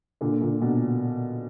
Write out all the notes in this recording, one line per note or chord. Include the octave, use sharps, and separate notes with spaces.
A#2 D3
A#2 D3
B2